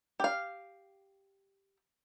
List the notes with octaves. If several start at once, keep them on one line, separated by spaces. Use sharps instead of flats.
G4 F5